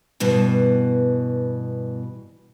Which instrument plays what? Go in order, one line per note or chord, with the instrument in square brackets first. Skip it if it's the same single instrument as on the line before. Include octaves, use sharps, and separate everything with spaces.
[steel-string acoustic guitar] G2 B2 E3